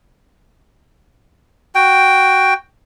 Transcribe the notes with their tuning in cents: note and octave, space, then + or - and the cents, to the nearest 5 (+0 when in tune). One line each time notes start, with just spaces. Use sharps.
F#4 +5 G5 +0